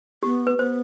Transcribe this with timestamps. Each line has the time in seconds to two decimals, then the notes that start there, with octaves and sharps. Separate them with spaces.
0.23 B3 G4
0.47 B4
0.58 B3 C5